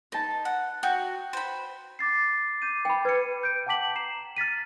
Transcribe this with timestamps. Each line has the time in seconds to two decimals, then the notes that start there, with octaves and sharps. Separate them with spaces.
0.12 D#4 B4 A5
0.45 F#5
0.83 F#4 G5
1.33 C5 B5
1.99 D6 A6 C7
2.62 D6 G6 D#7
2.85 G5 B5
3.05 B4 G#6 C#7
3.43 G6 D7
3.67 F#5 G5 A5 D6 B6 F#7
3.95 A#5 C7 E7
4.37 F6 A6 B6 D#7